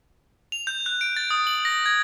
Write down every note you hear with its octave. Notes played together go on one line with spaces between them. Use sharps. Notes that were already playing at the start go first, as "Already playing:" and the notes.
F7
G6
F#6
D7
A6
D#6
F#7
A#6
G#6